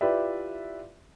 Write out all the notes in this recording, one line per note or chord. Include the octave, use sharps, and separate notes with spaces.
E4 F4 G4 B4 D5 E5